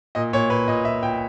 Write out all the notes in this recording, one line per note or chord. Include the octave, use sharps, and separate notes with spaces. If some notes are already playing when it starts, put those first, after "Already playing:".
A#2 D#5
A#2 C#5
A#2 B4
A#2 D#5
A#2 E5
A#2 G5